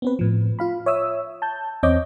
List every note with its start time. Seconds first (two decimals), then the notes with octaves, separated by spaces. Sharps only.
0.02 B3 C4 B4
0.19 A2 F3
0.59 F4 F5 B5
0.86 C#5 E5 D#6 E6
1.42 A5 G6
1.83 E2 C4 C#5 D#5 D6 G6